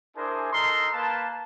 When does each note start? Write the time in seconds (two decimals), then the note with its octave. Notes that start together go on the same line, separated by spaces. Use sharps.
0.16 D4 E4 G#4 A#4 C5 G#5
0.52 D#4 A4 A#4 A#5 C6
0.92 A#3 A#4 B4 A5